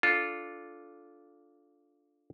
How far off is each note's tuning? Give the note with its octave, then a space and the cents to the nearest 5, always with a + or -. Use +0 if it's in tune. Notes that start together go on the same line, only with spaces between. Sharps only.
D4 -10 F4 +0 A4 -10